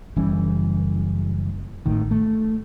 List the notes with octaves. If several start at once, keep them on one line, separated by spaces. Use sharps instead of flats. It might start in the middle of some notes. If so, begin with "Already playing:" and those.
F#1 E3 G3 C#4
G#1 A2 D#3
A3